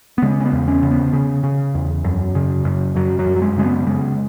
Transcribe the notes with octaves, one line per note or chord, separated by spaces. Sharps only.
B3
C#3 G#3
C#4
B3
E2
C#4
C#3
B3
C#3
C#3
E2
F#2
C#3
F#2
F#2 F#3
F#3
F#2
F#3
G#3
C#3 G#3
B3
C#3 G#3